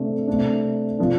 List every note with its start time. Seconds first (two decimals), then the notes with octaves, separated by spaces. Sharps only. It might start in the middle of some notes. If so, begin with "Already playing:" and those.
Already playing: C3 A3 D4
0.27 C3 A3 D4
0.99 C3 F3 D4